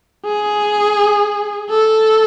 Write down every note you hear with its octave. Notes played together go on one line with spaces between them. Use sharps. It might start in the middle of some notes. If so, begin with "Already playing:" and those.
G#4
A4